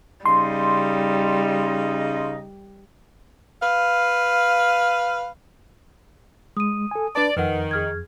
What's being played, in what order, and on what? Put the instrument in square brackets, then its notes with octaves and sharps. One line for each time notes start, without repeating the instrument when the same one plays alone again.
[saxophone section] C#3 D#4 [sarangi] G3 [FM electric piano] C6
[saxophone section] B4 F5
[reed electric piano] G#3 [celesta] D#6 D#7
[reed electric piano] A4 G#5
[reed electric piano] D4 B4 A5 [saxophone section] D5
[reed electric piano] F2 [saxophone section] D#3 [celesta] B4 F#5
[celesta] G#4 F6 G#6